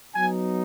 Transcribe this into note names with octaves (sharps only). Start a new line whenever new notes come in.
F#3 B3 D#4 G#5